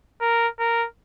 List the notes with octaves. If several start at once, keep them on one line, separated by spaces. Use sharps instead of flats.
A#4
A#4